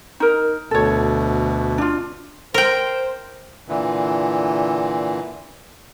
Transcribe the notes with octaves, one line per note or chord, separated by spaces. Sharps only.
D#4 A#4
D2 B2 A4 C#5
D4 F4
A#4 C5 G5
A#2 D3 E3